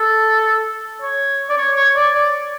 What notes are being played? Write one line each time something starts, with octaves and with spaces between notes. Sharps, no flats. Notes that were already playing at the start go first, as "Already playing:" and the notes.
Already playing: A4
C#5
D5
C#5
C#5
D5
D5